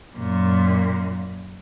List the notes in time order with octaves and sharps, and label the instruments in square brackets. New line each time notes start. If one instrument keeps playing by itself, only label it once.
[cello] F#2 A#2